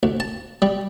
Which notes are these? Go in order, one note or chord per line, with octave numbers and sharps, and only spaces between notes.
D2
A5
G3